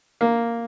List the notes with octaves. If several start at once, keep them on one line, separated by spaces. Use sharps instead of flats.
A#3